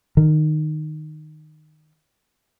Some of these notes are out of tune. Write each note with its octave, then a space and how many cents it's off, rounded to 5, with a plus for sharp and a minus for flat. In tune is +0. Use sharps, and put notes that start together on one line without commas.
D#3 -15